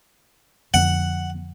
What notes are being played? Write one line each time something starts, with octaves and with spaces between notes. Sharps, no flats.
F2 D3 B3 F#5